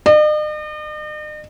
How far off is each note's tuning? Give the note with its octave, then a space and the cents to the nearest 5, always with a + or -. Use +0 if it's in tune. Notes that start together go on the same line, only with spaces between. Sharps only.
D#5 -45